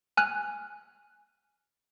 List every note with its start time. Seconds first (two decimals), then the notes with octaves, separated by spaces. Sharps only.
0.17 G#5 F6 F#6